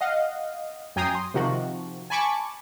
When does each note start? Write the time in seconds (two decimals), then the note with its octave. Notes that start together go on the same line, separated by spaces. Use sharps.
0.01 D#5 F5 F#5
0.96 F#2 G5 G#5 A#5 D#6 C7
1.15 C6
1.34 C3 D#3 F3 F#4
2.10 G#5 A5 B5 C#6 D6